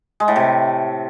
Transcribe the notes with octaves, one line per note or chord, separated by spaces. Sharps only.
G#3
A2
C3